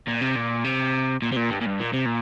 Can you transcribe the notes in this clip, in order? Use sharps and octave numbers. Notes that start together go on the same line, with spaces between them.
A#2
C3
A#2
C3
A#2
C3
A#2
G2
A#2
G2
A#2
C3
A#2